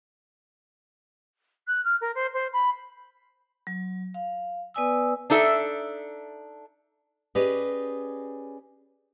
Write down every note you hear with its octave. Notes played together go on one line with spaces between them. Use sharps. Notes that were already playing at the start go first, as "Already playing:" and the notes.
F#6
F6
A#4
C5
C5
B5
F#3
F5
B3 B4 D5 G#5 D#6 E6
D4 D#4 A4 E5
C#4 G4 G#4 B4 D5 D#5